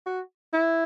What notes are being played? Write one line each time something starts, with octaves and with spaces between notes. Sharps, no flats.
F#4
E4